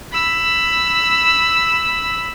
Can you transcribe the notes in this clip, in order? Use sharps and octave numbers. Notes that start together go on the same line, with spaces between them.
B5 E6